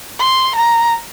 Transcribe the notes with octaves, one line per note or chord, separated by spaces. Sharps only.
C6
A#5